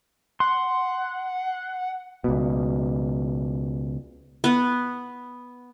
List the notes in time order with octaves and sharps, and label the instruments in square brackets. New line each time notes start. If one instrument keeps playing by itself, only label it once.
[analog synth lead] F#5 [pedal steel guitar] C6
[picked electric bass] C#2 B2
[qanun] B3 B4